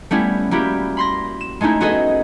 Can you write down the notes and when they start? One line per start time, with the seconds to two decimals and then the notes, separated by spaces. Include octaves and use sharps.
0.11 G3 A3 B3 C#4 E4
0.51 G3 A#3 E4 F#4 G4
0.97 B5 C6 A#6
1.41 E7
1.61 G#3 A3 C#4 D#4 E4
1.81 B3 F#4 G#4 A4 B4 D#5